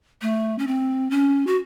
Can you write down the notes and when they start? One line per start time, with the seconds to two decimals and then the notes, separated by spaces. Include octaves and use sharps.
0.22 A3
0.59 C#4
0.67 C4
1.11 C#4
1.47 F#4